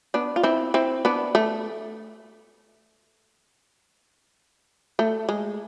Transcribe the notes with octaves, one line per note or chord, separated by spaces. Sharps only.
B3 D4
F4
C4 E4
C4 E4
B3 D4
A3
A3
G#3